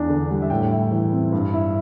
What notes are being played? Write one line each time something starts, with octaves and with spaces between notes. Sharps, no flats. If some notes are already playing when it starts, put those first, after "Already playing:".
Already playing: E2 D4
D3
G3
E5
A2 G5
E4
E3
C4
G2
E4